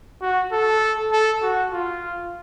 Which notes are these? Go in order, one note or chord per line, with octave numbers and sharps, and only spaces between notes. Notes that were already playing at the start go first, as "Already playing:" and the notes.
F#4
A4
A4
F#4
F4